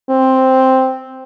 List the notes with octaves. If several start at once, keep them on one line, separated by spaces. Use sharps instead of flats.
C4